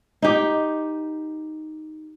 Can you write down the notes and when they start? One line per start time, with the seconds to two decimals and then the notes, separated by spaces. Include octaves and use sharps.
0.22 D#4 G4